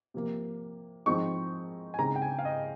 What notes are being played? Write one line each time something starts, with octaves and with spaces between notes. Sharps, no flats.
C3 F3 A#3
F3 G#3 C4 D#4 C#6
G#5
C#3 G#3 C4 D#4 A#5
G5
G#5
F5
D#5